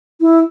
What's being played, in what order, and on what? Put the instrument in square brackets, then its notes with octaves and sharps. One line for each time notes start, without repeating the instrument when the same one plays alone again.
[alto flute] E4